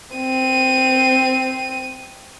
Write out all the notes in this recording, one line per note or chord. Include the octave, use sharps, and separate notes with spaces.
C4 D#7